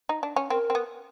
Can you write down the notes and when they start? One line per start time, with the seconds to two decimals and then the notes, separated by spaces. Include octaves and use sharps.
0.09 D#4
0.23 D4
0.36 C#4
0.50 C4 A#4
0.70 C4
0.75 B3